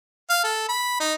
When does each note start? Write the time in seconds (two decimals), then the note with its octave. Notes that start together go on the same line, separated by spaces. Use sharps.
0.30 F5
0.44 A4
0.69 B5
1.00 D#4